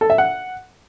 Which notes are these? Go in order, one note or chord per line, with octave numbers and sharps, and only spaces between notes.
A4
E5
F#5